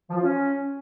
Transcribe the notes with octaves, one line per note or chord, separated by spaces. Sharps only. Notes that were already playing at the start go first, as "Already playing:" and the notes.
F3
F4
C#4